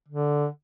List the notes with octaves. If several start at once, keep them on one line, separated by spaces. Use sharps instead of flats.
D3